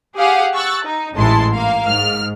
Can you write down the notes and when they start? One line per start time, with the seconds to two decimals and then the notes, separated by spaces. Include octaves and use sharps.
0.16 G4 G#4 F5 F#5
0.54 C#6 E6 F#6 A6
0.85 D#4
1.16 A1 G#2 G#3 E4 A5 C6
1.54 A#3 F5
1.86 G#2 F6